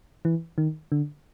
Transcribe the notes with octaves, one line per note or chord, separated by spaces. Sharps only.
E3
D#3
D3